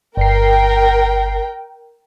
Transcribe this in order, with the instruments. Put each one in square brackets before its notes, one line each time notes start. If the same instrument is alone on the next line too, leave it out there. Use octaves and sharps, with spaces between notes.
[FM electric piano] G1 C7 [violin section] A#4 G5